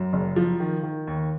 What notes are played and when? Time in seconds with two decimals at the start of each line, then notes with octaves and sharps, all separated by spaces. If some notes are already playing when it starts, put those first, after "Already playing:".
Already playing: F#2
0.13 F#1
0.36 F3
0.60 D#3
0.83 D#3
1.07 D#2